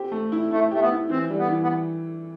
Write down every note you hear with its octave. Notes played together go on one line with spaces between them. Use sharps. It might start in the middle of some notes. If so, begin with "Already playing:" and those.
Already playing: C4 G4
A3
E4
A3 E4
A3 G4
B3
E4
E3 C4
G3
B3
E3
B3